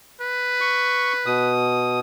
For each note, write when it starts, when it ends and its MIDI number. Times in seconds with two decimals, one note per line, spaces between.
0.21 1.53 71
0.61 1.13 85
1.26 2.00 47
1.26 2.00 87